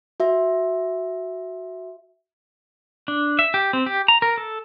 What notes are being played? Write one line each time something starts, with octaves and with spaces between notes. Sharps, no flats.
F#4 E5
D4
E5
G4
C4
G4
A#5
A#4
A4